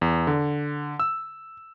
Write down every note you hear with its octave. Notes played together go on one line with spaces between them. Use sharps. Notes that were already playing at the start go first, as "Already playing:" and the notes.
E2
D3
E6